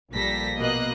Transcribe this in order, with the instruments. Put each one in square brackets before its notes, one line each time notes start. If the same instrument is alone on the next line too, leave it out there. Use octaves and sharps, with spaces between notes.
[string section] A#1 A#2 G3 A4 A#6 B6
B2 A#3 D#5 F#6